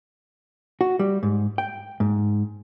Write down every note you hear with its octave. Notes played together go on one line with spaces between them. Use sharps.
F#4
G3
G#2
G5
G#2